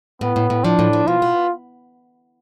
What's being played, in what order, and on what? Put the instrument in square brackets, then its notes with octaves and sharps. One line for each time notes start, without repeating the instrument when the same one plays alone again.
[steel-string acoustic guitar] A2 [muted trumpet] B3
[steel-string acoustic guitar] A2
A2
[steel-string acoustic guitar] F3 [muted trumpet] D4
[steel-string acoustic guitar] A2
F3
[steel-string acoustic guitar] B2 [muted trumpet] F4
[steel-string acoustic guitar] B3